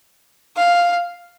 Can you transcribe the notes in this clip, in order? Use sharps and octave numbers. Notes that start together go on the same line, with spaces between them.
F5